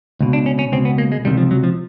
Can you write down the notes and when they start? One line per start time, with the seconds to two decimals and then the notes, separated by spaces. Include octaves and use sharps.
0.21 C#2 B2
0.33 D4
0.46 C#4
0.59 C#4
0.72 C#2 B2 C4
0.85 B3
0.98 A#3
1.12 G#3
1.25 C#2 C3 D#3 G3
1.38 F3
1.51 F#3
1.64 F3